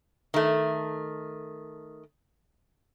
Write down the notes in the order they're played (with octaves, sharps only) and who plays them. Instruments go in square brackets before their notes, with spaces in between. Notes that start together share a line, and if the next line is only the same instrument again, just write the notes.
[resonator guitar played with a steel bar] D#3 A3